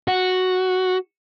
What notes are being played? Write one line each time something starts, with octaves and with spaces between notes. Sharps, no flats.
F#4